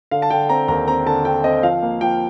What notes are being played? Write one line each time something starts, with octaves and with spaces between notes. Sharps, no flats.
D3 F5
A5
D3 G5
C4 A#5
D#2 A#5
C4 A#5
D3 A5
D3 G5
C4 D#5
F3 F5
A#3
F3 G5